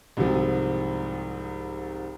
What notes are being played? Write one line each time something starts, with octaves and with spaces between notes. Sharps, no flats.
C2 G#2 C3 F3